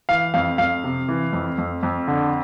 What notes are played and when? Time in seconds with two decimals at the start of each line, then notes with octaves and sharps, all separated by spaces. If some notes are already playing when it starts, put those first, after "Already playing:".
0.09 E3 F5
0.34 F2 F5
0.58 F2 F5
0.84 C3
1.08 E3
1.33 F2
1.58 F2
1.83 F2
2.08 D3